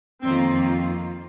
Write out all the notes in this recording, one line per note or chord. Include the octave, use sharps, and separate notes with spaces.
F2 D#3 A#3 C4 F4